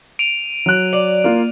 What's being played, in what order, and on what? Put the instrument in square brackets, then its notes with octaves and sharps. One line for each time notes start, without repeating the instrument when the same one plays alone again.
[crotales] D7 D#7 F7
[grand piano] F#3 F#6
[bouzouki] D5
[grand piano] A#3 F4